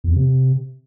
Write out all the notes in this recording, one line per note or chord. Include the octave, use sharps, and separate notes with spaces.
E2
F2
C3